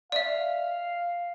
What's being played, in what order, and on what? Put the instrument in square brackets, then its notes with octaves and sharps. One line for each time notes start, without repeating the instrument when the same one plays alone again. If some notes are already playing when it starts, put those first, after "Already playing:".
[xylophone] D5 E5 [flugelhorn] F5